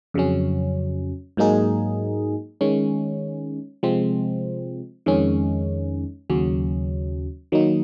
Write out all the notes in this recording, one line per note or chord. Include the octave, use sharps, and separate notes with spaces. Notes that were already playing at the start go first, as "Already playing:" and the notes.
F2 C#3 F#3 C#4
G#2 F#3 A#3 D#4 G#4
D#3 G#3 C#4
C3 F3 G#3 C4
F2 D#3 G#3 C#4
D#2 C#3 F#3 C#4
D#3 F#3 A#3 D#4